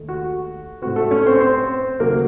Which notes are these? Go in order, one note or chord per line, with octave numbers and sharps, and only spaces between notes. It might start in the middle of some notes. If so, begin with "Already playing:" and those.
Already playing: D#2 D#3 A3
F#4
A2 A3 C4 F#4
A3 A4
C#4 C#5
C4 C5
C4 C5
D#2 C#3 F#3 A3 A#3 A#4